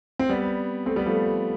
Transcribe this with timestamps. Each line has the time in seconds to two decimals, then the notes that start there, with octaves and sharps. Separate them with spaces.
0.19 C4
0.29 G3 B3
0.86 A3 C4
0.96 G3 B3
1.06 F3 A3